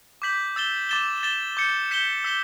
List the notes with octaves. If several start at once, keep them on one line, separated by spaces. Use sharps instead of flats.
D6 G6 B6 F#7
E6 A6 E7 G7
D6 A6 E7 G7
A6 E7 G7
D6 G6 C#7
G6 B6 E7 G7
E6 B6 E7 G7